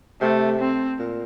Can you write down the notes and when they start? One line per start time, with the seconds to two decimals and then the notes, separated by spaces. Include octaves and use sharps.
0.21 C3 A3
0.60 C4
0.99 A#2